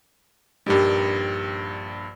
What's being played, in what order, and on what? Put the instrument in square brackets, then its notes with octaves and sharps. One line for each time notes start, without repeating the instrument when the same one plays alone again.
[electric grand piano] A#1 G2 [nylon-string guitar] D#4 G4 A#4